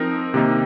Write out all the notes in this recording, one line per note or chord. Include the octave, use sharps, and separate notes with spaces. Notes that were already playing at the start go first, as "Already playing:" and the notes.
Already playing: F3 C4 D#4 A#4
C3 D#3 A#3 D#4